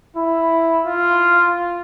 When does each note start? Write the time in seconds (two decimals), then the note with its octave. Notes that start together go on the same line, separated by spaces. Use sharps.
0.16 E4
0.86 F4